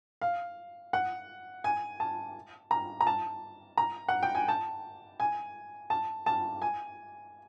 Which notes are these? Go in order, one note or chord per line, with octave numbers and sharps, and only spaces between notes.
F5
F#5
G#5
A5
A#5
A#5
A5
A#5
F#5
G5
G#5
A5
G#5
A5
A5
G#5